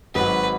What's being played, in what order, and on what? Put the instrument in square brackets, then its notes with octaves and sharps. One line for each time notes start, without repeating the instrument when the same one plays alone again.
[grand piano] G#1 G#2 F#3 [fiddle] B4